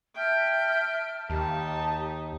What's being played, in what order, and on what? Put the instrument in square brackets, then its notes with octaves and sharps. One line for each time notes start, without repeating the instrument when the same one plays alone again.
[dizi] E5 [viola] G5 [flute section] A5 F6
[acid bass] D#2 [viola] D#4 [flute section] G4 [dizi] A5